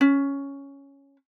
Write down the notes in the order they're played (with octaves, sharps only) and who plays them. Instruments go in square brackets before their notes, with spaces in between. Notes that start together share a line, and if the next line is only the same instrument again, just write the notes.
[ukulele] C#4